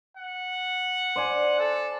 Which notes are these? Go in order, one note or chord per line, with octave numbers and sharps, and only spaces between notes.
F#5
C5 D5 G#5
A4